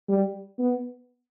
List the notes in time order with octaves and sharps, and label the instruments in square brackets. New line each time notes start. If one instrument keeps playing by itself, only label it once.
[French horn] G3
B3